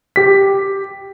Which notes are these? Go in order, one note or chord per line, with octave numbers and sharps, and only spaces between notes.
G4 B6